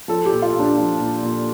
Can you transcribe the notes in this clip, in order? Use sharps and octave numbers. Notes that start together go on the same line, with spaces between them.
F3 A4
G4
A#2
F4
A#2
D4
F3
A#2
A#2